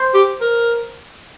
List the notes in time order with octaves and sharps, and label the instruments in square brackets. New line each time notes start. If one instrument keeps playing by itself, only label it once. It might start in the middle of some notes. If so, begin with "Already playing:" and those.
Already playing: [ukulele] C5
[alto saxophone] G4
A#4